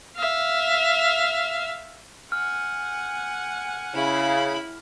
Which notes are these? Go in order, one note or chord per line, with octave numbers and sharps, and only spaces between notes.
E5 F5
F#5 G#5 F6
C#3 E4 B5